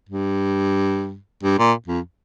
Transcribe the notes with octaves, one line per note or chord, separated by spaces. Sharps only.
G2
G2
A#2
F2